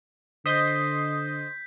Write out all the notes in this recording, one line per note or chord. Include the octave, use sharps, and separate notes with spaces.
D3 C5 D#5 C6 D#6 G6 B6